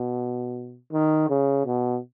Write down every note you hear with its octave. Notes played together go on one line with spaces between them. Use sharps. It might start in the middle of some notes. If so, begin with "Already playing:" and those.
Already playing: B2
D#3
C#3
B2